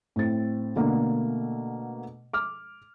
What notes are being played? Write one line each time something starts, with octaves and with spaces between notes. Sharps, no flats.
A2 A3 C4 A6
B2 D3 A3 A#3
D6 F6